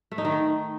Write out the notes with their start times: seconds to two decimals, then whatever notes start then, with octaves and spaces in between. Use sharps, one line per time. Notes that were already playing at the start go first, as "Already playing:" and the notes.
0.12 A3
0.18 D#4
0.25 D#3